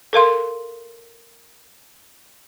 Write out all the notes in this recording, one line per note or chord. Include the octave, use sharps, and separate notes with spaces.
A4 A#4 F5 C6